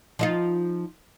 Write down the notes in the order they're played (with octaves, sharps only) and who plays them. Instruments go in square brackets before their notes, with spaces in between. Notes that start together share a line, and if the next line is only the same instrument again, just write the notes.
[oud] F3 D#4 F4